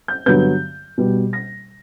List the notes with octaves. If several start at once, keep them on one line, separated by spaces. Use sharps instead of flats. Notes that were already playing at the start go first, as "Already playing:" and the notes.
G6
G2 D3 F#3 B3 G6
B2 G3 B3
A#6